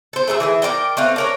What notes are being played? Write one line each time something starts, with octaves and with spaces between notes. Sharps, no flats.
A4 C5
A3 G#4 A4 E5
E3 G#4 E5
A#4 C#5 D5 G5
A3 C4 B4 F5
D4 A#4 C#5